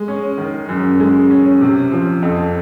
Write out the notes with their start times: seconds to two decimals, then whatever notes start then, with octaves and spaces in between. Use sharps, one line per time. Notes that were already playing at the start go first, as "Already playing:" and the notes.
Already playing: G#3
0.08 C#4
0.38 D#3
0.69 F#2
1.00 G#3
1.30 C#4
1.61 C3
1.92 F3
2.22 F2